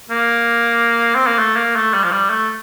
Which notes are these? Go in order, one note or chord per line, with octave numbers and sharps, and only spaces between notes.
A#3
C4
A#3
A3
A#3
A3
G3
F3
G3
A3